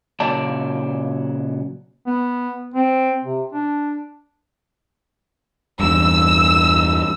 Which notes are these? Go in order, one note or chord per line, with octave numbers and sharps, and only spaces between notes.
A#2 C#3 F#3 D5 A5
B3
C4
C3
D4
E2 G2 E6